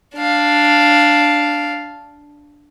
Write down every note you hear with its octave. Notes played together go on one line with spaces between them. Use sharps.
D4 F5